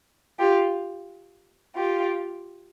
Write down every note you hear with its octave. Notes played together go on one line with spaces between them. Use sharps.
F4 G4
F4 G4